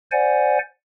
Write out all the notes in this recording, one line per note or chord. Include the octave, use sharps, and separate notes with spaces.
C5 D5 F#5 G#5